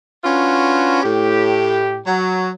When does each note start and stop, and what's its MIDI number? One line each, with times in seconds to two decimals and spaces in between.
0.24 0.98 61
0.24 0.98 62
0.24 0.98 65
0.24 0.98 66
0.24 0.98 71
1.03 1.99 45
1.03 1.99 67
2.06 2.49 54